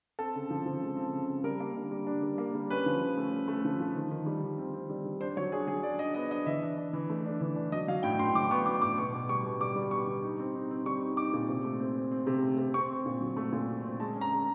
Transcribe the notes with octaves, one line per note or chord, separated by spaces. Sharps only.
C4 A4
C#3
F3
F3
G#3
C4
C#3
C#3
G3 A#4
A#3
D3
G3
D4
G3
A#3
G3
C#4 B4
F3
C#4
A3
C#4
A3
F3
F3
D#3
D#3
G3
D#3
C4
C4
G3
G3
D4 C5
F#3 C#5
D4 G#4
F#3 G#4
D4 D5
D4 D#5
B3 D#5
D4 D#5
E3 E5
D4
D4
E3
A3
D4
E3
D4
F#3 D#5
F#3 F5
A2 G5
A2 C6
F#3 D6
B3 C#6
F#3 D6
A2 D6
B2 C#6
B2
G3 C#6
B2
G3 D6
G3
B3 C#6
G3
D#4
C4
D#4
C4
G3 C#6
D#4
D#4 D6
A#2
C3
A3
C4
C4
C4
C3
A3
C3
C4 C#6
C4
A#2
F#3
A3
A#2
C4
C4
G#3 A5
C#4
A#5
G#3